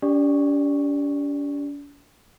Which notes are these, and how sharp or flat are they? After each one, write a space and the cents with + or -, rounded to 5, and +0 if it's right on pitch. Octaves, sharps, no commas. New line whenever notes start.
D4 -45 G4 +5 D5 +0